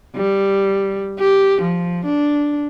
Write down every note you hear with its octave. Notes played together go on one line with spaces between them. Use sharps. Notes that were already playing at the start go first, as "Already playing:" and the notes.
G3
G4
F3
D4